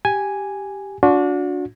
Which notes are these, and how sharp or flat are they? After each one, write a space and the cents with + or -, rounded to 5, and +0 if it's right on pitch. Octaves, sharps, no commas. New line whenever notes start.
G4 +0 G#5 +0
D4 -25 F#4 -35